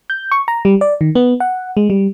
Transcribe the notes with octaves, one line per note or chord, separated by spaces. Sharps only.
G6
C#6
A#5
G3
D5
D#3
B3
F#5
G#3
G3